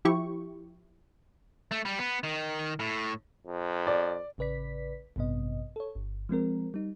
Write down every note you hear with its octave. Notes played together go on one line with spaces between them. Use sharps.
F3 E4 G4 C#6
A3
G3
B3
D#3
A2
F2
D5
A1 C#3 B4 D5 B6
A1 G2 C3 B3 D#5
A4 C#5
G1
F3 G#3 C4 A#4
G3 D#4